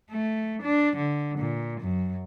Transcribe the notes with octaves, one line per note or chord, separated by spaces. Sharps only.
A3
D4
D3
A#2
F#2